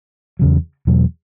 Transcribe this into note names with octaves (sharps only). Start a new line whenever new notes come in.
E2 C#3 F#3
E2 B2 F#3